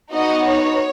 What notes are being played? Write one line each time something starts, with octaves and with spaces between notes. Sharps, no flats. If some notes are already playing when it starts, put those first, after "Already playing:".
B3 D#4 F#4 D#5
C#5